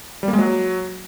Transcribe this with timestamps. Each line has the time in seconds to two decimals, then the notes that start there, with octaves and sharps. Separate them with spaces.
0.23 G3
0.28 A#3
0.33 G#3
0.38 F#3